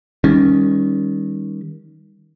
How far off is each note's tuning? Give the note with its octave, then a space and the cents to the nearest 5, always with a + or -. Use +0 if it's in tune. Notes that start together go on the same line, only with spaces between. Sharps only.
D#3 +10 G3 +25 C#4 +0